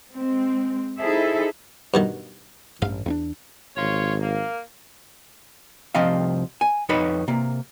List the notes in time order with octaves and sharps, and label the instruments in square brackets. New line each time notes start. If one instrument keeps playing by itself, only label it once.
[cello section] G#3 C4
D#4 E4 G#4 A4 C5 E5
[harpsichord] G2 B2 D#3
[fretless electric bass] A1 G2 [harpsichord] F5
[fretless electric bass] E2 C4 D4
[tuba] G#1 [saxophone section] F4 C#5
[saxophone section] A#3
[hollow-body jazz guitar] C2 C3 F3 C4 D#5 F5
G#5
F2 D#4 B4 C#5 B5
C3 A#3